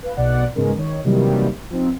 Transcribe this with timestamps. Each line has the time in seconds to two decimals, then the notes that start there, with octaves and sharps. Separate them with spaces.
0.03 B4 F5
0.17 B1 B2 D5 F#5
0.55 G#2 C#3 G#3 B3 C#4 A#4
0.76 D#3 C#5
1.04 C3 D#3 E3 F#3 G3 A#3
1.70 F3 C4 D#4